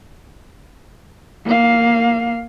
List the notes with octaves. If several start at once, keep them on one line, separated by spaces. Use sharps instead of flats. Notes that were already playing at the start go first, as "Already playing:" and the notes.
A#3 F5